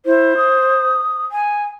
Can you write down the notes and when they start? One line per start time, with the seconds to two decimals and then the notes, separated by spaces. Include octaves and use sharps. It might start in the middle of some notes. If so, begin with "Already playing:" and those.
0.06 E4 C5
0.37 D#6
1.32 G#5